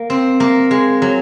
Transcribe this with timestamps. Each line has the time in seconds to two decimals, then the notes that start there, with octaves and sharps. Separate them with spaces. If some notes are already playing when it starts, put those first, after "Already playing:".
Already playing: A#3
0.10 C4
0.40 A#3
0.71 G#3
1.02 F#3